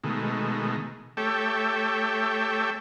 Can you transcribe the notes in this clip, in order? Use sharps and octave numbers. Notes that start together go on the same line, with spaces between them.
B2 D#3 G#3 A3
A3 G4 A4 C#5 E5 G5